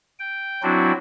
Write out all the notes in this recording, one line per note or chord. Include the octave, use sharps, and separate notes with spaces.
G5
F#3 C4 D4 E4 F#4